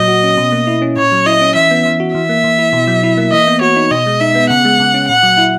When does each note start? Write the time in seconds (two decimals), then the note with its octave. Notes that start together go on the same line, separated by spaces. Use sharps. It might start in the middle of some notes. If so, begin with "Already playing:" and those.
Already playing: A#2 F#3 D#5
0.08 F#4
0.24 C#4
0.37 B2
0.52 A#3
0.67 E4
0.82 C#4
0.97 A#2 C#5
1.12 F#3
1.26 E4 D#5
1.41 C#4
1.55 E3 E5
1.71 B3
1.85 E3
2.00 F#4
2.14 E3 E5
2.29 A#3
2.44 E3
2.59 E4
2.73 B2
2.87 F#3
3.03 E4
3.17 A#3
3.32 E3 D#5
3.47 B3
3.61 F#4 C#5
3.76 D#4
3.91 B2 D#5
4.06 G#3
4.20 D#4 E5
4.35 B3
4.50 C#3 F#5
4.65 G#3
4.80 C#3
4.94 C#4
5.08 A#2 F#5
5.23 F#3
5.38 E4